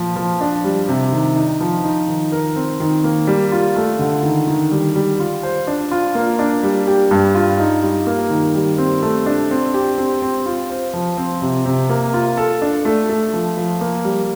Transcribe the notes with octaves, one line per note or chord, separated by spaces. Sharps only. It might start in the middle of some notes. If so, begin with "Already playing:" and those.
Already playing: A#2 F3
F3
D4
G3
C3
D#3
D#4
F3
D#4
D#3
A#4
C4
D#3
A#3
G3
F4
A3
D3
D#3
D#3
G3
G3
F4
C5
D4
F4
A#3
D4
G3
G4
G2
F4
D#4
G3
A#3
D#3
G3
C4
A3
D4
C4
G4
C4
C4
F4
C5
F3
C4
C3
C3
A#3
F4
A4
D4
A3
A3
F3
F3
A#3
G3